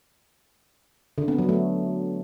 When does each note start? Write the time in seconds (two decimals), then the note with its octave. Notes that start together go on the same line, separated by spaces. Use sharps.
1.18 D3
1.28 B3
1.38 F#3
1.49 A3